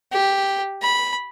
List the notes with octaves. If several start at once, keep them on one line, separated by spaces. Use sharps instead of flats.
G4
B5